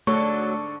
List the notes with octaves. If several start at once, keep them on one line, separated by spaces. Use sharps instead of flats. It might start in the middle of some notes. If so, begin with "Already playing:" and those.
G#2 D3 F#3 A3 A4 C#6